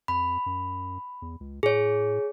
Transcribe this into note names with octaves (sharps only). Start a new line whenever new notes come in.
F2 B5
F#2
E2
C#2
A2 G#4 C#5